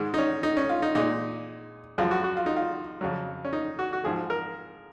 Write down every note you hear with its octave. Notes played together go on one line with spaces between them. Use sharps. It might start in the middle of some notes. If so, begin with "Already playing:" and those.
Already playing: G#2 D#3 G#3
D#4
C#4
D#4
C#4
F4
D#4
A#2 G#3 D#4
F#2 F3 G#3 F4
F#4
F#4
F4
D#4
F4
F2 C#3 F#3
C#4
D#4
F#4
F#4
G#2 F3 G#3 G#4
A#4